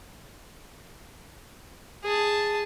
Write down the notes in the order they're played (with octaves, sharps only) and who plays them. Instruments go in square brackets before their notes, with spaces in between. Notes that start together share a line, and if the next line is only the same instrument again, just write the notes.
[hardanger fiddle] G#4 A5